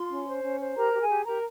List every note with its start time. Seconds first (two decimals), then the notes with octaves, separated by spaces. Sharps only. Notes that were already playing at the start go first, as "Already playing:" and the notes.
Already playing: F4 C6
0.10 C#4
0.27 C5
0.43 C#4
0.60 C5
0.76 G4 A#4 A#5
0.94 G4
1.01 G#4 G#5
1.10 G4
1.26 G4 A#4 A#5